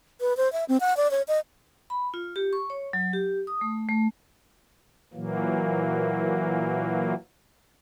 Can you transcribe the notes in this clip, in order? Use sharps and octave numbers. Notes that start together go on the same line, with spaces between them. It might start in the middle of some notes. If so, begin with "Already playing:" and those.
B4
C5
E5
C4
F#5
D5
C#5
D#5
B5
F4
G4
C#6
C#5
F#3
G4
D#6
A3
A3
A#2 E3 F#3 A#3